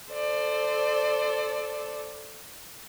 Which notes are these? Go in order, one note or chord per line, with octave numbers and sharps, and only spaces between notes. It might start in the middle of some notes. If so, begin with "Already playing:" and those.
A4 C5 D5